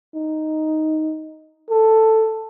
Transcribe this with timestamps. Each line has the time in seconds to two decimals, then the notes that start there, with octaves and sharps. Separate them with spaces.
0.15 D#4
1.70 A4